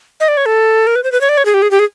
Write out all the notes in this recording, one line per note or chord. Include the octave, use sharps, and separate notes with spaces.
D#5
D5
C#5
A4
A#4
B4
C5
B4
C#5
D5
C#5
G#4
G4
G#4
G4
G#4